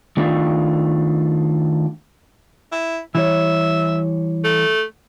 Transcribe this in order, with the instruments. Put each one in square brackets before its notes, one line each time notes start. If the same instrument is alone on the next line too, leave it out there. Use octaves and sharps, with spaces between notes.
[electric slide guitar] D#3 A3 D4 F4
[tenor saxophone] E4
[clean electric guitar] E3 G3 C#5 [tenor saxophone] E5
[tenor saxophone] A3